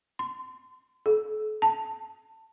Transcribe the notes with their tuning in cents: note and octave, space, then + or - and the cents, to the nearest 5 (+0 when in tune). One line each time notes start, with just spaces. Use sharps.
C6 -30
A4 -40
A5 +20